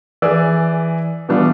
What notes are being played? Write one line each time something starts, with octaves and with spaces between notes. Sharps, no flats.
E3 G#4 D5 E6
B2 E3 G3 D4 F4